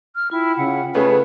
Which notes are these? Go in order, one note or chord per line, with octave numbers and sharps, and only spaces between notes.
F6
E4 F4 G5
C#3 F#5
C#3 A3 C#4 G#4 B4